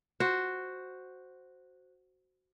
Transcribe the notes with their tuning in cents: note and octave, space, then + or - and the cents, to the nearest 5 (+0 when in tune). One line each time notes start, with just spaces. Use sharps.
F#4 +0 C5 +0